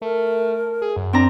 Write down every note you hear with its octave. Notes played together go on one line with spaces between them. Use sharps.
A3 A#4
G#4
F#2
C4 D4 A#5